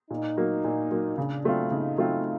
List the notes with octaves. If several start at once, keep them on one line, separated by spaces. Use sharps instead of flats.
A#2 D#4
F#3 A#3
A#2
F#3 A#3
C#3 D4
F#3 A3 C4 F4
C#3 D#4
F#3 A3 C4 F4